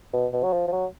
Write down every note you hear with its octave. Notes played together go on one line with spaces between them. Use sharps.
B2
B2
F#3
F3
F3
F#3